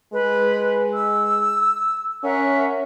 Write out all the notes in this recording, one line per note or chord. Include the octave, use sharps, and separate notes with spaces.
G#3 B4
E6
C#4 A#4 E5 F#5